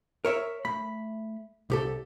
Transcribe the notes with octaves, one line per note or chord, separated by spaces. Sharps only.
A#4 C#5 E5
A3 B5
C2 G4 A4